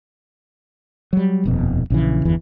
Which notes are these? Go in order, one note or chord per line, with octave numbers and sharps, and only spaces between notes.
F#3 G3
D#1 F2 B2
A#1 C#3 E3
G1 E2 E3